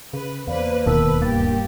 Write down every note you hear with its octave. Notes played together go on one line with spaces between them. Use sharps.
C#3 B4
E2 A#3 B4 C5 D5 F5
D1 D#2 B2 D#3 A#4 B4 A5 E6
G2 A#3 G4 F5 A6